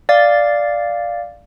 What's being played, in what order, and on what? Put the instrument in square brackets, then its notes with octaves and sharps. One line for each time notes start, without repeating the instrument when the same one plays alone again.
[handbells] D5 F5 A6